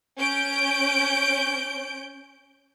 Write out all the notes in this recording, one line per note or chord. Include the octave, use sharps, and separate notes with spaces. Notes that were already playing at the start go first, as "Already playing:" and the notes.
C#4 G6 D7